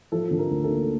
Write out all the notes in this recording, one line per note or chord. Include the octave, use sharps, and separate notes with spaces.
F3 A4
D3
A#4
D2
A4
A#3